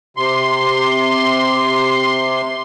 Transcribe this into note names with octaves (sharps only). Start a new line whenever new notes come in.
C3 C6